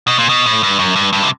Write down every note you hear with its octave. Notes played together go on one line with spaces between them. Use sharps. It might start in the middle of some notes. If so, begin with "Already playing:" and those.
B2
A#2
B2
A2
G2
F#2
G2
G2
C3